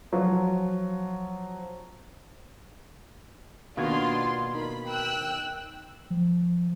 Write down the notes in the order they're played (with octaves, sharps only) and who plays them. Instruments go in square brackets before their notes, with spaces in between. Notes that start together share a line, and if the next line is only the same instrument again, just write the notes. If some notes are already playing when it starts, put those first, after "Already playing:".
[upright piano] F3 F#3
[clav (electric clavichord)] B2 D#3 [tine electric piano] A#3 F#5 G#6 [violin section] D4 F4 C6
[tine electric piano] D#4 A#4 [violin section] B5
[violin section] G5 E6 F#6
[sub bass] F3